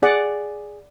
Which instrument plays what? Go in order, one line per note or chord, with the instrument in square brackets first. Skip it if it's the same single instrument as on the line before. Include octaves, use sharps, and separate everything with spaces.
[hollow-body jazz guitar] G#4 [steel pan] D5 F#5